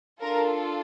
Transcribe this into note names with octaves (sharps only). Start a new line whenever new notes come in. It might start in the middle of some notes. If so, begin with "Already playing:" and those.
D4 F4 A4 A#4